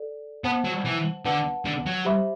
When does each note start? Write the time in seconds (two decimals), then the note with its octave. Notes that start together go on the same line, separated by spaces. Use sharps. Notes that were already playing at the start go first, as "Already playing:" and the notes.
Already playing: A4 D5
0.44 B3 C5 F#5 A5
0.65 F#3
0.85 E3
1.25 D3 B4 F#5 A5
1.65 D3
1.86 F#3
2.05 G4 C5 E5 B5 D6